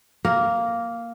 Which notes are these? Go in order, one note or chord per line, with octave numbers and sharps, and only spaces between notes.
A#3